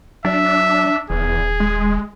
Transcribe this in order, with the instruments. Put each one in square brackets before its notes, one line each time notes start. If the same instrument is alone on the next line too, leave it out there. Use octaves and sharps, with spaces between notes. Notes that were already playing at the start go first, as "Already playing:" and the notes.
[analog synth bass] F#3 [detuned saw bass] D4 [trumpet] E5
[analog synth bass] D#1 [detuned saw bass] E2 [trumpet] G#4
[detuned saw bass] G#3